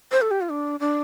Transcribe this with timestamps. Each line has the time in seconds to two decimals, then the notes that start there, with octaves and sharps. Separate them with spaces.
0.11 C5
0.21 A4
0.31 G4
0.41 F4
0.49 D4
0.80 D4